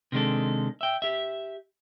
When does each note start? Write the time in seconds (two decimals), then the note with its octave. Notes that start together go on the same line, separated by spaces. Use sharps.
0.12 C3 D#3 G#3 D4 A4
0.81 E5 G5
1.02 G4 E5